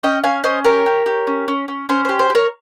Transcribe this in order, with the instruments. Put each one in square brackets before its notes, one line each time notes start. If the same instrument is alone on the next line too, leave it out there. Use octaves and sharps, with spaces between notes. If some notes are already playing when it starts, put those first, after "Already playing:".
[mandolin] C#4 D#5 G5
C#4 F5 G#5
C#4 C5 D#5
G4 A#4 C#5
G4
G4
C#4
C#4
C#4
C#4 C5
G4 C5
C5
G4
A#4 C#5